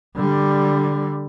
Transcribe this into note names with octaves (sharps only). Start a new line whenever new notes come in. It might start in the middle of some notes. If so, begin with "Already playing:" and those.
D3 G3